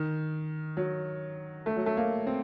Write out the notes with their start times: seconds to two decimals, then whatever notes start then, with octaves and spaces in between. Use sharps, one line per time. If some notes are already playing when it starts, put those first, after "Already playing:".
Already playing: D#3
0.77 F#3
1.66 A3
1.76 F#3
1.86 A3
1.97 A#3
2.27 C4